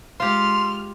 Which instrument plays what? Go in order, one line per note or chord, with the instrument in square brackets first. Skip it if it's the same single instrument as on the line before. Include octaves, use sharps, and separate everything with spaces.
[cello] G#3 [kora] F4 G4 [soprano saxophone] C6 [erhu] F6